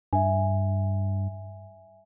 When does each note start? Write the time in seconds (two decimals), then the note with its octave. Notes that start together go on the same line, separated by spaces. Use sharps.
0.13 G2 E5 G#5